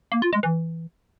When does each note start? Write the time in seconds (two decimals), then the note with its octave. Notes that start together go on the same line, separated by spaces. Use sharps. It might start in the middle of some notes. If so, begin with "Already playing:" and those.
0.12 A#3
0.22 F4
0.33 G#3
0.43 E3